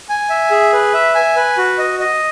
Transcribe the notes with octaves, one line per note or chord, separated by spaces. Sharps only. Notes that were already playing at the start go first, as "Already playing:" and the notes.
G#5
E5
G#4
B4
E5
G#5
B4
F#4
D#5
D#5